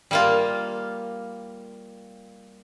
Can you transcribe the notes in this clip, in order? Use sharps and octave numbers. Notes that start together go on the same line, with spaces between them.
G3 A#3 F4